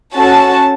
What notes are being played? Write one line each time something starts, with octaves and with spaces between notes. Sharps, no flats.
C#4 F#4 A4 A5